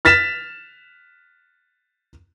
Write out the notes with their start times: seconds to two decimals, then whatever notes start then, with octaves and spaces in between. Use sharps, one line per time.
0.05 F6 A6 B6 E7